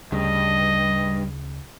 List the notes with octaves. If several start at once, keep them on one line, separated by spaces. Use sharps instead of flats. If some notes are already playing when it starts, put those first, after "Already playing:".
D2 G2 C#3 D#5